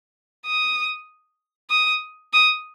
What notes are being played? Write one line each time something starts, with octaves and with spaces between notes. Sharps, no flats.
D#6
D#6
D#6